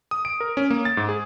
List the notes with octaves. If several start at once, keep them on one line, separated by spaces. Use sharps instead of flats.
D#6
D7
A#4
C#4
A#3
A6
G#2
G#4